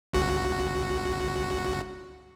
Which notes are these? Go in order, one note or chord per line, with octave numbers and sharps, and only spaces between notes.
G1 C#2 F#4